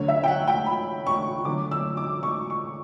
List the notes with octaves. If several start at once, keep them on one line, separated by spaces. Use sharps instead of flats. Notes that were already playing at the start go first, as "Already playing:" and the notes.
Already playing: D2 D3 F#3 C#5
E5
G5
F#5
G5
B5
C#6
D2 D3 F#3 D6
E6
D6
C#6
C#6